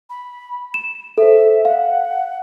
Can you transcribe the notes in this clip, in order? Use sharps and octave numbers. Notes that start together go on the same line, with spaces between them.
B5
E7
A4 C5 E5
F5 F#5